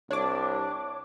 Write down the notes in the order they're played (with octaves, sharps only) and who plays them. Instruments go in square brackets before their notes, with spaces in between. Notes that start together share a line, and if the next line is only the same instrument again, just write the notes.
[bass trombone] C2 [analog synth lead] D4 [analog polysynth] C#5 D6